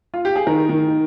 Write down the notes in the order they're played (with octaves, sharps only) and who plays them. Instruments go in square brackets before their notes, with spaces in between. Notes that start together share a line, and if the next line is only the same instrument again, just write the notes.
[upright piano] F4
G4
G#4
D#3 A#4
D#3